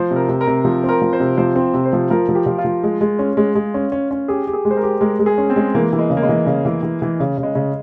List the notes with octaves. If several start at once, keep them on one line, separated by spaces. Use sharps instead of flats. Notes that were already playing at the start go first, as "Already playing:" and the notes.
Already playing: F3 C5
C3
A#4
C3
A#4
C3
F3
C4 A#4
F3
C5
C3
F3 C5
C4
C3
C5
F3
F3 A#4
F3
G4
F3
F4
F3
G#3
G#3
C#4
G#3
G#3
C#4
C#4
C#4
G4 G#4
G4
G#4
G#3
C5
A#4
G4
G#3 A#4
G#3
G#4
C#4
C4
G#3
E3 A#3
E3
G#3
C#3
A#3
G#3
E3
C#3
E3
E3
E3
C#3
C#3
G#3
C#3